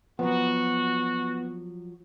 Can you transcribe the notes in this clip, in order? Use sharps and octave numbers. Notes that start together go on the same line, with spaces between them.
F3 F#3 B3 F#4